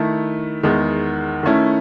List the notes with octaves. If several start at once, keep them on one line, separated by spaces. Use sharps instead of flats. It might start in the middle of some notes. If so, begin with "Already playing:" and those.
Already playing: D#3 A3 E4
E2 D#3 G#3
D#3 A3 C#4 E4